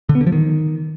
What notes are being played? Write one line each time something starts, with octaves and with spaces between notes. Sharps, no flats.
D3
B3
D3
F3
D#3